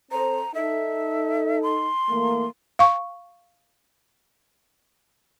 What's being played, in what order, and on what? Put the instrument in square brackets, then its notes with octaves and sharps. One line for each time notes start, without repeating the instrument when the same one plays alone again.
[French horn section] C4 A4 C5 [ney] A#5
[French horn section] D#4 A4 [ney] E5
[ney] C6
[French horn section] E3 A3 A#3
[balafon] F5 C#6